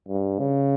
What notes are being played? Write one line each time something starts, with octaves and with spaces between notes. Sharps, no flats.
G2
C#3